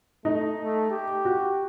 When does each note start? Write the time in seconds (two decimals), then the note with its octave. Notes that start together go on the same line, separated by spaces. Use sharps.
0.25 A3 D#4
0.59 A3
0.91 G4
1.25 F#4